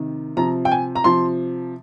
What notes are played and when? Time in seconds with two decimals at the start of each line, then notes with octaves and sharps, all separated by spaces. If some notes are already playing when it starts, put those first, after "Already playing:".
Already playing: C3 D#3
0.37 C3 F3 A#5
0.65 G5
0.71 G#5
0.95 A#5
1.04 C3 F3 C6